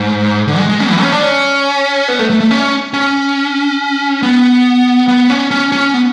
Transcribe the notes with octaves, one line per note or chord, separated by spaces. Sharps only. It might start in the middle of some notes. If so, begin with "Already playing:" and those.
Already playing: G#2
D3
G#3
G#3
C#4
E3
C#4
D4
C#4
B3
A3
A3
A3
C#4
C#4
B3
B3
C#4
C#4
C#4
B3